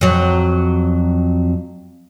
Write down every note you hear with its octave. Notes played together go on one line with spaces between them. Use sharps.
F2 F#3